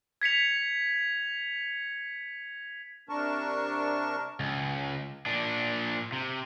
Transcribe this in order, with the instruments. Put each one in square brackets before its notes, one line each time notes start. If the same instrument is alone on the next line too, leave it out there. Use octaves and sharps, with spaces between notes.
[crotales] G#6 B6 C#7 F7
[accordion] C3 D4 A#4 A5 C#6
[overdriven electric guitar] C#2
A#2 D4
C3